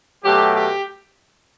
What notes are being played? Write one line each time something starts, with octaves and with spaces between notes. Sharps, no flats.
B2 F#3 A3 G4
G4